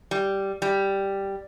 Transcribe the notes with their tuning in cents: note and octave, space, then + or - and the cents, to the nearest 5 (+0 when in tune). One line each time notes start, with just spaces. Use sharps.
G3 -5
G3 +0